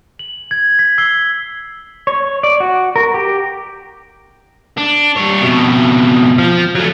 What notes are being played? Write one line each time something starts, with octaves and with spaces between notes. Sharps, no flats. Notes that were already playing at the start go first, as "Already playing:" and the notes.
F#7
G#6
B6
E6 C7 G7
C#5
D5
F#4
A#4
G4
D4
G3 C#5
F2 B2
F3
F#3 A3